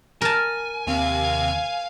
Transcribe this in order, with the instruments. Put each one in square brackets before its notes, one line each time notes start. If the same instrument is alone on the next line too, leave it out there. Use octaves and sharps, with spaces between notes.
[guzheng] A#4 A5 [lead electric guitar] G#5
[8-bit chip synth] D#2 C3 [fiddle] F5